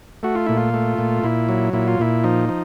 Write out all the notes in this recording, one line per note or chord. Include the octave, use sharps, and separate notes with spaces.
A3 F#4
F4
A#2 E4
F4
A3
A#2
A#2 E4
F#3
A#2 E4
F4
A#2 E4
F3 D#4
F3